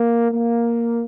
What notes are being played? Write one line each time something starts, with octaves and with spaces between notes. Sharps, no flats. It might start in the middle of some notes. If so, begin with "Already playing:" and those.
Already playing: A#3
A#3